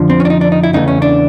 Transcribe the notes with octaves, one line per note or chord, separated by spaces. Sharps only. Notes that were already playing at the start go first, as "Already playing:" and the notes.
Already playing: F2 D3 F3
C4
C#4
D4
D#4
D4
D#4
E4
E2 C#3 E3 A3 D#4
C#4
D4